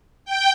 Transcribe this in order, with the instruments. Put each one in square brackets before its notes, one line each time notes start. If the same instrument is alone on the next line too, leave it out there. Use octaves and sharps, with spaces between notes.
[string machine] G5